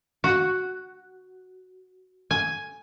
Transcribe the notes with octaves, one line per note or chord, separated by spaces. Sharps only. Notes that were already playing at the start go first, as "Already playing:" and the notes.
F#4
G#5